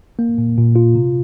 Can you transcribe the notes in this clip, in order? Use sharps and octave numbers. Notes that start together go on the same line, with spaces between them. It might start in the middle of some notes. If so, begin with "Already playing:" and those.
A#3
A#2
A#2
F4
C3